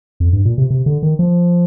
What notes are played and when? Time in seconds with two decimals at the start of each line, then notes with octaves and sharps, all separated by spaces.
0.20 F2
0.33 G2
0.45 A#2
0.58 C3
0.70 C3
0.86 D3
1.03 D#3
1.19 F3